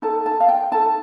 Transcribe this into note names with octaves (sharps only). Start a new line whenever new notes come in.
D#4 A4 A5
A5
F5
G5
D#4 A4 A5